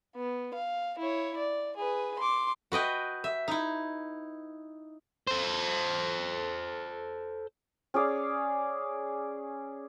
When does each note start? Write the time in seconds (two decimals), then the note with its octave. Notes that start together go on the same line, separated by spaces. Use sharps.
0.16 B3
0.54 F5
0.99 E4 C#5
1.37 D5
1.76 G#4 B4
2.19 C6 D6
2.72 F#4 B4 D#5 G5
3.24 E5
3.48 D#4 E4
5.27 A4 C5
7.94 C#4 G#4 D5 F5